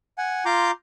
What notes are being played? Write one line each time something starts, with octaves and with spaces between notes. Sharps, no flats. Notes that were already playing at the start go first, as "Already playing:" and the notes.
F#5 G#5
F4 A#5 C6 D6 G6